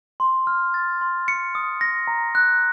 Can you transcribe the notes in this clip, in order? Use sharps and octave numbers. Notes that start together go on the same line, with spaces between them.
C6
F6
A6
C6
C#7
D#6
A#6
A#5
F#6